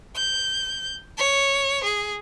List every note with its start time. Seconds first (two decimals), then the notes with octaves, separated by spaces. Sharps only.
0.16 G6
1.18 C#5
1.84 G#4